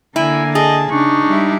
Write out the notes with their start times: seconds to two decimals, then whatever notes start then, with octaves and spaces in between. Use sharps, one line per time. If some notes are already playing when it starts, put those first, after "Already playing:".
0.16 D3 A#3 E4 G#5
0.55 G#4 D#5 A5
0.91 C#3 D4 D#4 C#6
1.26 G3 E4